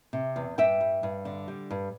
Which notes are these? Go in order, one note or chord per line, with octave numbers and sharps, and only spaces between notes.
C3
E2
G2 E5 G5
G3
G2
D3
G3
G2